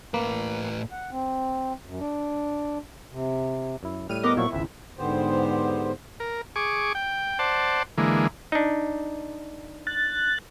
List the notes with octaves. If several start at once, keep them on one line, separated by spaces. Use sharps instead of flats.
A2 A#3 B4
F#5
C4
F#2
D4
C3
F#2 E4
A2 G3 F6 D#7
B3 A#4 D#5 D6
A#2 F3 F#3 E4 C#6
G#1 C#2 C4 E5
G#2 D3 B3 G4 C5
A#4
G#4 C#6 D6
G5
C5 D5 F#5 A5
D3 E3 G#3 A#3
D4 D#4
F#6 A6